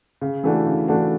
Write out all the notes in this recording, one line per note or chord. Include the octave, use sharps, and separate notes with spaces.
C#3
E3 A3 D4 F#4
C#3
E3 A3 D4 F#4